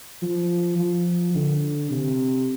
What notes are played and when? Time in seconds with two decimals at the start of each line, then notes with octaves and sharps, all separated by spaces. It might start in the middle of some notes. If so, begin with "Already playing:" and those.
0.22 F3
0.79 F3
1.35 D3
1.90 C3